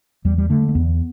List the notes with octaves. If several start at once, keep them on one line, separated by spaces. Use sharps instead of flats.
E2 G3
G3
D3 A3
A3
E2 B3